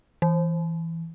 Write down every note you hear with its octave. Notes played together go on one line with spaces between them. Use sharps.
E3